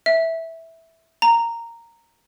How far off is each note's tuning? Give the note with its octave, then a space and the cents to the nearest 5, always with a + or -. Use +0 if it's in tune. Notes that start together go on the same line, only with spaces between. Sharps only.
E5 -10
A#5 -10